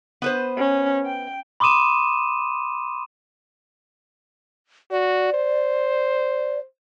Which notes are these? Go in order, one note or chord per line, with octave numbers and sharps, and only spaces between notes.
B3 B4 C5
C#4
G5
B5 C6 D6 D#6 D#7 E7
F#4 D5
C5